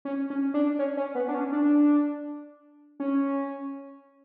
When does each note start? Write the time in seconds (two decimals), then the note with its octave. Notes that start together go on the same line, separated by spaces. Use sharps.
0.05 C#4
0.30 C#4
0.54 D4
0.79 C#4
0.97 C#4
1.15 B3
1.28 D4
1.34 C#4
1.52 D4
3.00 C#4